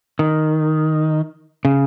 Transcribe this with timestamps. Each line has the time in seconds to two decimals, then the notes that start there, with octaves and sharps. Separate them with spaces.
0.19 D#3
1.65 C#3